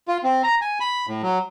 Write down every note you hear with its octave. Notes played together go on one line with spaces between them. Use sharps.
F4
C4
A#5
G#5
B5
A2
F#3